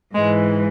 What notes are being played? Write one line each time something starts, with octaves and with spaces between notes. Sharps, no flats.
G#2 E3 G#3